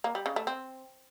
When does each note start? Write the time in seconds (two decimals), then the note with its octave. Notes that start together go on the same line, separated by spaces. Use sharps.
0.04 A#3
0.15 G3
0.26 C#3
0.36 A3
0.47 C4